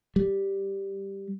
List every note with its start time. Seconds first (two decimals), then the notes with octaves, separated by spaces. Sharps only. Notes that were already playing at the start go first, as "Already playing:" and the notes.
0.16 G3